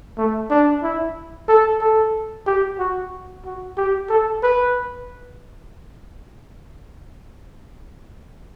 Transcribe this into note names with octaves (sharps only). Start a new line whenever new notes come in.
A3
D4
E4
A4
A4
G4
F#4
F#4
G4
A4
B4